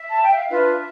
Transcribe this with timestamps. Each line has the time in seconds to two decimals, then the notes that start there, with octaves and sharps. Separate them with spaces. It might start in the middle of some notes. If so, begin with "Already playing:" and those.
Already playing: E5
0.11 A5
0.24 G5
0.36 F5
0.49 D4 F4 B4 E5